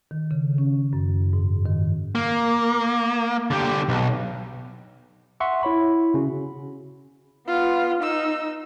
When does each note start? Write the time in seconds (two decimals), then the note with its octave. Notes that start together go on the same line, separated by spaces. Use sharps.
0.11 D#3
0.31 C#3
0.58 C#4
0.93 F#2
1.33 G#2
1.66 D#3
2.15 A#3
3.51 D3 G4
3.89 B1
5.40 E5 F#5 C6 C#6 E6 B6
5.63 E4 C#5 B5
6.14 C#3 C#4 F#4
7.47 B3 F4
8.01 D#4 E6